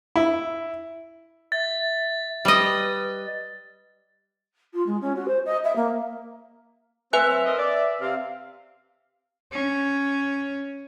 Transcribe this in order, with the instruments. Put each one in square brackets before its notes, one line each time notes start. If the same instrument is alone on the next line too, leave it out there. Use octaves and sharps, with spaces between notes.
[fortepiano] E4
[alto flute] E5 [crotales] A6
[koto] G3 D#5 [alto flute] B4
[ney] F4
G#3
C#4
F#4
C5
D#5
E5
A#3
[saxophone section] A3 A#3 C4 [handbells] B4 G#5 F#6 [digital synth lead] E5
[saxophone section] F#3 C4
C4 A#4 D#5
D5
[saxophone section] C3 C4 [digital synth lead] F5
[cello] C#4